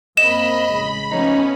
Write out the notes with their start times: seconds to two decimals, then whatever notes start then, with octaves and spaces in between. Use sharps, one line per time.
0.17 F#2 A#3 C4 D#5 B5 E7
0.71 A1 C#3 G#3
1.11 F3 A3 B3 C#4 D#4